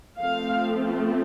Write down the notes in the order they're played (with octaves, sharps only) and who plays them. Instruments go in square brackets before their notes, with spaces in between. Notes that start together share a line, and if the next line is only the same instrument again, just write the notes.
[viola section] F3 A3 C4 F5